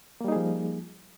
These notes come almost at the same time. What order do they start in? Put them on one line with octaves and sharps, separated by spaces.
A#3 G3 D#4 G#4 F3